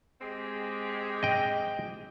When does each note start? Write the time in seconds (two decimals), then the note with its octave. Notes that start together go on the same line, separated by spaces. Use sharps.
0.21 G#3 C4 G4
1.23 D#5 G5